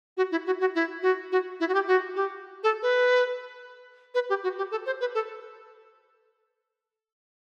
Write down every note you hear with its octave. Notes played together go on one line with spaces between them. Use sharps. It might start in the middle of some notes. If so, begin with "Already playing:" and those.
F#4
E4
F#4
F#4
E4
F#4
F#4
E4
F#4
G4
F#4
G4
A4
B4
B4
G4
F#4
G4
A4
C5
B4
A4